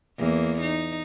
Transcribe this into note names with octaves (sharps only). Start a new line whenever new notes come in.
E2 A#3
D#4